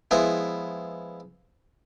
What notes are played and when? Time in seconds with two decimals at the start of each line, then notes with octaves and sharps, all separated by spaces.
0.11 F3 G#3 B3 E4